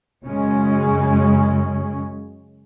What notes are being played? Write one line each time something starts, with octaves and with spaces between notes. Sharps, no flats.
F#2 C#3 G#3 C#4